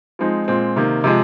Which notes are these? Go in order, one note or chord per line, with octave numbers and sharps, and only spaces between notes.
F3 G#3 C4 D#4
A#2 G#3 C4
C3 D#3 A#3
C3 F3 G#3